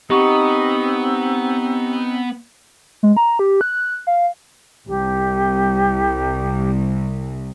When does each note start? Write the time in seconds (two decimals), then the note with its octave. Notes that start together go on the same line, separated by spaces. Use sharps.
0.10 B3 C4 D#4 G4 C#6
3.03 G#3
3.17 A#5
3.39 G4
3.61 F#6
4.07 F5
4.88 C2 G4